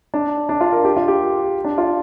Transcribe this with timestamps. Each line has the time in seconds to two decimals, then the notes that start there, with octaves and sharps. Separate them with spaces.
0.14 D4
0.49 D4
0.61 F4
0.72 A#4
0.85 G4
0.96 F4
1.08 G4
1.65 D4
1.78 F4